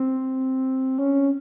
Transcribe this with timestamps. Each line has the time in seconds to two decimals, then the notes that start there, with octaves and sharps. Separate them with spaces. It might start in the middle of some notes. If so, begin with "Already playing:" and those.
Already playing: C4
0.99 C#4